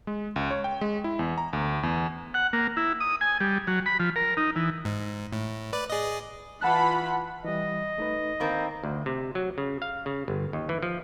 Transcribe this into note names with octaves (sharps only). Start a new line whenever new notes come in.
G#3
C#2
C#5
G5
G#3
E4
E2
A#5
D2
E2
F#5
A#3
E4
D#6
G#5
G3
F#3
B5
F3
A#4
D#4
E3
G#2
A2
B4 D5
G#4 D5 D#5
E3 F4 F#5 A5 B5 F#6
E3 G3 D#5
A3 D#4 B4
D#3 A#3 C4 B5
D2
C3
F#3
C#3
F5
C#3
G1
D#2
E3
F3